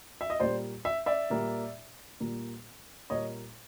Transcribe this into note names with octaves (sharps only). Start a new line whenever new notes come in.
E5
D#5
A#2 G3 A#3 C5 D5
E5
D5 E5
A#2 G3 A#3
A#2 G3 A#3
A#2 G3 A#3 C#5 D#5